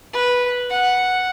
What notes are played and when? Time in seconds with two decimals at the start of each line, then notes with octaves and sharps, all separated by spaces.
0.13 B4
0.70 F#5